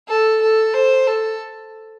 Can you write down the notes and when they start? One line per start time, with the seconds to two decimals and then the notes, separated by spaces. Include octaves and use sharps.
0.08 A4
0.42 A4
0.74 C5
1.08 A4